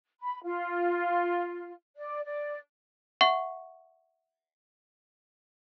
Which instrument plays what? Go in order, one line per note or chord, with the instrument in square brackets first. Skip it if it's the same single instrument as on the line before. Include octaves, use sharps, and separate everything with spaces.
[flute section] B5
F4
D5
D5
[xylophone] E5 F#5 C#6